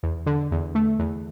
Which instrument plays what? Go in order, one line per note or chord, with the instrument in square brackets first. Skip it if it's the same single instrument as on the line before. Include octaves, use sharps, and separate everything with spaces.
[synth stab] E2
D3
E2
A3
E2